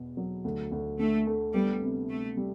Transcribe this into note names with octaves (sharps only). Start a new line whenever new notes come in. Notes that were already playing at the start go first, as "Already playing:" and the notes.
Already playing: E2 B2 B3
F#3
D2
D2
D3 A3
A3
G3 B3
C3
C3 A3
G3